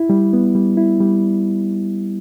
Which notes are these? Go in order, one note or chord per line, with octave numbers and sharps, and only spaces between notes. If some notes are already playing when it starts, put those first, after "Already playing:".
Already playing: E4
G3
B3
G3
E4
G3